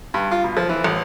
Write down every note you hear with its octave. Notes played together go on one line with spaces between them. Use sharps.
G2
F4
B2
F3
E3
A1